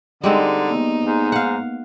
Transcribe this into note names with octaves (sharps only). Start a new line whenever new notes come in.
D3 G3 G#3 C4 D#4
A#3 B3
G#2
F5 F#5